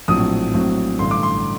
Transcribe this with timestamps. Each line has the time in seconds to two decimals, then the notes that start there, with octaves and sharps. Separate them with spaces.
0.08 A#1 A2 F#3 C4 D#6
0.54 A#1 A2 F#3 C4
0.99 A1 G2 D3 C6
1.11 D6
1.23 C6